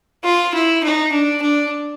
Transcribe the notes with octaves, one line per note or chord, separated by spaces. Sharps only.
F4
E4
D#4
D4
D4